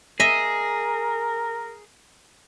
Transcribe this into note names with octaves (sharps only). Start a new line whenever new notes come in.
G#4 A#4 D#5 E5